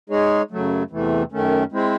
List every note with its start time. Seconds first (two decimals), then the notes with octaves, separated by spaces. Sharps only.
0.10 G#3 D#4 G#4 C#5
0.51 F#2 C#3 F#3 A3
0.90 E2 C3 E3 A3
1.32 F#2 D#3 A3 C#4
1.72 G#3 C4 E4 C5